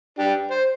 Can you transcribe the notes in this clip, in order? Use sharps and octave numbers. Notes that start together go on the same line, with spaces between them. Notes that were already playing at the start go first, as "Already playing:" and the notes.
D4 G4
C5